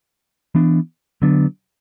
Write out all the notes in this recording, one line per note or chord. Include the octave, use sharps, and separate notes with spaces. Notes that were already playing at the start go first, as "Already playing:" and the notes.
E3 B3 D4
D3 F#3 B3 D4